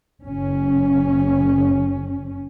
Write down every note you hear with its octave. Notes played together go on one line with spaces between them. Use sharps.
F#1 C#4